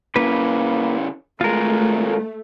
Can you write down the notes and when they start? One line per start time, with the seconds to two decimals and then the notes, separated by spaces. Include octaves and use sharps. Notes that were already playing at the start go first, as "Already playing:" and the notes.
0.16 C#3 E3 A#3 B4
1.41 D#2 G#3 A3 F4 A#4